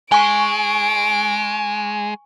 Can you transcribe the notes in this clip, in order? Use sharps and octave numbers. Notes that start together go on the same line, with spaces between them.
G#3 G#5 C#6 D7